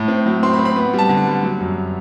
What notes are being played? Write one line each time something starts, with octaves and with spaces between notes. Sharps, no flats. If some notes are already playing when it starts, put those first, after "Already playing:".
Already playing: A2
C4
F#3
C4 C6
B5
C4
B5
B3
G3
A5
D3
G3
F#3
F#2